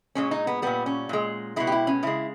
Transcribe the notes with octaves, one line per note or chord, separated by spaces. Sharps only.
A#2 G#3 C#4
D#4
B3
A#2 G3 B3
C#4
A#2 G#3
B2 G#3 E4
G4
E4
C#4
C#3 G#3 E4